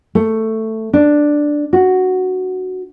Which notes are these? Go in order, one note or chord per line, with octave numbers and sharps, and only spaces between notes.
A3
D4
F#4